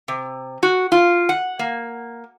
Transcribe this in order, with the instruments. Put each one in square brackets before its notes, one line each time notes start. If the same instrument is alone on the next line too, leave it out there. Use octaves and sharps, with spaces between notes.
[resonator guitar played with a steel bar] C3
F#4
F4
F#5
A#3